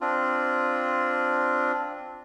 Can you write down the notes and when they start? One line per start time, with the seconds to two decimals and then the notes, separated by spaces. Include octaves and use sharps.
0.01 C4 D4 F4